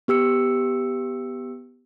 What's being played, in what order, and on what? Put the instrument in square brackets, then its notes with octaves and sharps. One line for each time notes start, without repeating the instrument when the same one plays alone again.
[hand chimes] B3 G4 E6 C#7